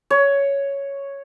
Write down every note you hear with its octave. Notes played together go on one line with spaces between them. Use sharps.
C#5